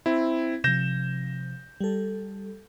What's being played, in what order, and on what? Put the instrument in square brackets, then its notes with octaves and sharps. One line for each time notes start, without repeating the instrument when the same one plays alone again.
[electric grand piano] C4 E4
[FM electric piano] C3 F3 [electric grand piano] G6 A#6 E7
[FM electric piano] G3 A4